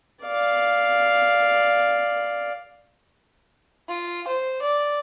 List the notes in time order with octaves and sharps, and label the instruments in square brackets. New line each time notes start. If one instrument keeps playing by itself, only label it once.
[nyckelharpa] D5 F5
[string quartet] F4
C5
D5